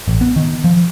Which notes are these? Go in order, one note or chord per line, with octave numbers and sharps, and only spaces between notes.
A1
B3
D#3
F3